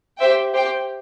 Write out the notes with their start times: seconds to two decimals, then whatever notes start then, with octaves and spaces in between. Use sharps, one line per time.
0.19 G4 C5 E5 G5
0.54 G4 C5 G5